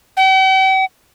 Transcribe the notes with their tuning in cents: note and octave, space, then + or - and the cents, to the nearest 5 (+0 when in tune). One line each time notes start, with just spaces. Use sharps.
G5 -45